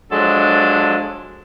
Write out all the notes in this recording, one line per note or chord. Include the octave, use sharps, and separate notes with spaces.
F3 F#3 G#3 D4 A4